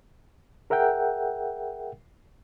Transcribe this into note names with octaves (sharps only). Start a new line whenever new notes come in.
G#4 A#4 E5 F#5 G5